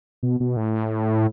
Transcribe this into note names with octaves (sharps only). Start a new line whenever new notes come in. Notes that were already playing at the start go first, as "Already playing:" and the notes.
B2
B2
A2